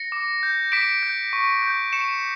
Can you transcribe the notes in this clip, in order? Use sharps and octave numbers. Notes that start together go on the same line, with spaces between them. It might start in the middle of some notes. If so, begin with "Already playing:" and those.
Already playing: A#6 C#7
D6
G6
D6 B6 D7
G6
C#6
G6
C#6 C#7 E7